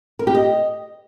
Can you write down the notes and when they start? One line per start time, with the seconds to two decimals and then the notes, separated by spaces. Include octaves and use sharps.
0.19 A#4
0.27 G4
0.35 D#5